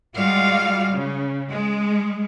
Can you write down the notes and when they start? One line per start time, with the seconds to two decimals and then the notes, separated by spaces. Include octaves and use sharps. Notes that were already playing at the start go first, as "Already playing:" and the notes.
0.16 G3 G#3 F4 F#4 D5 F5
0.92 C#3
1.51 G#3